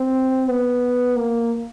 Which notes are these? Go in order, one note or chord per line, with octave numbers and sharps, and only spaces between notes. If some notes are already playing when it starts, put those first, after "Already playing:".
Already playing: C4
B3
A#3